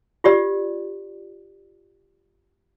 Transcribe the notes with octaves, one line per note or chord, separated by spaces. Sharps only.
F4 G4 D5